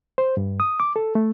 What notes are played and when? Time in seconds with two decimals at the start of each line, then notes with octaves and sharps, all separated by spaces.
0.18 C5
0.37 G2
0.60 D#6
0.80 D6
0.96 A4
1.15 A3